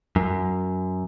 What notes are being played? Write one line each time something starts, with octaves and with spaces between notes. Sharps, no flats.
F#2